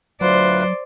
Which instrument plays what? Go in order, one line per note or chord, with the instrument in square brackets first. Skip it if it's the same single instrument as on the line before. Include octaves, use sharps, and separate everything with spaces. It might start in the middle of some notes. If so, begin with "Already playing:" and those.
[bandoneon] D2 F4 B4 [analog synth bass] F#3 [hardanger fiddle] C5 [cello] D5